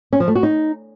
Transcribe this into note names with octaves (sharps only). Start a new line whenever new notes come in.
C#4
F3
A3
F#4
D#4